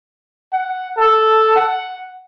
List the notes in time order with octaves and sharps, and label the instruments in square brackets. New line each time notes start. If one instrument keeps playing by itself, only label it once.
[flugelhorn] F#5
A4
F#5